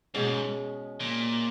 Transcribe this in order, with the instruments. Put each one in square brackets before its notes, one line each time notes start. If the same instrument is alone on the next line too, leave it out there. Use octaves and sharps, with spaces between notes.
[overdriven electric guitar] G#2 [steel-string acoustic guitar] B2 G#3 C#4
[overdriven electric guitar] A#2